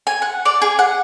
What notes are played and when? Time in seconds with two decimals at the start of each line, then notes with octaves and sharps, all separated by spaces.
0.07 G#5
0.22 F#5
0.45 D5
0.62 G#4
0.79 F#5